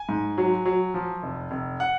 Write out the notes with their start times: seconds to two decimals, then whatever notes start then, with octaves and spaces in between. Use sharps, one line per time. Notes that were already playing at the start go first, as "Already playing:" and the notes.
Already playing: G#5
0.09 G#2
0.38 F#3
0.66 F#3
0.94 F3
1.23 F1
1.51 F1
1.80 F#5